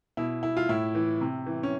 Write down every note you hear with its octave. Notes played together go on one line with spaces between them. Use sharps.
B2 E4
E4
F4
A2 E4
E3
C3
E3
C#4